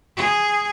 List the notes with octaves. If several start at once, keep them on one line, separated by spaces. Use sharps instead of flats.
G#4